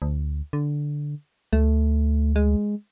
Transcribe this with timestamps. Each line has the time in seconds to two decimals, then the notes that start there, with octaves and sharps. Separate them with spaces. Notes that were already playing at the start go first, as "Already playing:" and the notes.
0.02 D2
0.53 D3
1.53 D2 A3
2.36 G#3